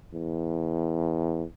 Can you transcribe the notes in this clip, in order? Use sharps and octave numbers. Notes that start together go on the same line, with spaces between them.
E2